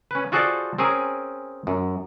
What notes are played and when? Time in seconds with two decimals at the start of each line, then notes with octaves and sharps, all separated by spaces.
0.11 C#4 B4
0.32 F4 F#4 G#4 A4 C5 D5
0.78 C4 C#4 G#4 A#4
1.67 F#2